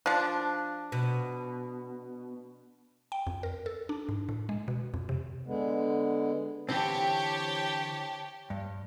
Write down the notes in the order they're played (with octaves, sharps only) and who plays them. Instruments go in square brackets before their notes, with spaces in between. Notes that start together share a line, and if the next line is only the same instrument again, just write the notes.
[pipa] F3 D4
[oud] B2
[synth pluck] G5
F2
A#4
A4
D4
G#2
A2
G#3
B2
F2
C3
[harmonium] D3 G#3 B3
[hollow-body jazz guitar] D3 E3 C4 [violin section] G4 C#5 A5
[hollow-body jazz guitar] G2